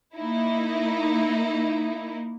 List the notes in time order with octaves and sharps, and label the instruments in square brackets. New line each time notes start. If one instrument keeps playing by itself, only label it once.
[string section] A#3 D#4 E4